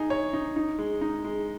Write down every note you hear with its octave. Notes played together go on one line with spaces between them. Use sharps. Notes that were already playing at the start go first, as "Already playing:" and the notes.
Already playing: D#4 G#4
C#5
D#4
D#4
G#3
D#4
G#3